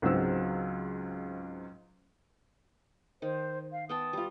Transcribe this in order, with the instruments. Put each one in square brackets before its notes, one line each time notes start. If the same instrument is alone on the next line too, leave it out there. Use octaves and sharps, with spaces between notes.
[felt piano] C#2 G#2 F#3 C4 E6
[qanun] D#3 [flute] C5
[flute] F5
[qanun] B3 G5 A5 [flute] D#6
[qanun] G3 F4